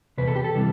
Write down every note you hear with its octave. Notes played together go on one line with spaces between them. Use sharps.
E2 C3 B4
A4
G4
A4
C3 E3 G3